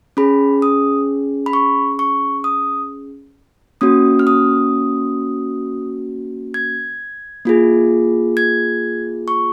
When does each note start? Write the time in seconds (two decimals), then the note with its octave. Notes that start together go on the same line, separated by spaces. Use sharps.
0.17 C#4 G#4 B5
0.62 D#6
1.46 B5
1.53 C#6
1.99 C#6
2.44 D#6
3.81 A#3 C#4 F#4 D#6
4.19 F6
4.27 D#6
6.54 G#6
7.45 A#3 F4 G#4
8.37 G#6
9.28 C#6